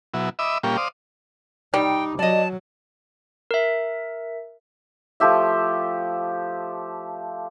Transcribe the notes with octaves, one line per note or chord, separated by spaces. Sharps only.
B2 F#3 E4
D#5 E5 B5 D6 E6
A#2 G3 A#3 C#4 F4 G4
C5 D5 F5 D#6
G3 D#4 G5
F#3 D5 D#5 A5
A#4 E5
F3 A3 G4 E5